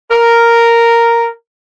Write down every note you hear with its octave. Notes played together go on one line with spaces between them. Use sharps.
A#4